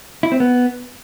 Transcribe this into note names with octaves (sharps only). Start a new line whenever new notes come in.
E4
C4
B3